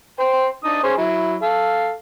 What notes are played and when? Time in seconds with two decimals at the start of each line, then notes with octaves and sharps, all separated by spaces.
0.20 C5 G5
0.64 D4 D#4 D#6
0.83 C#4 G#4 C5
0.97 F#3 E4
1.42 A4 F5